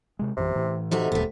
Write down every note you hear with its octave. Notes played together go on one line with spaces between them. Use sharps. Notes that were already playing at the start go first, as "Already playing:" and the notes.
C3 G#3
A#1 F#2 C3 E3
A2 E3
C3 A3 D#4 F#4
D#1 D2 A#2 A3 B3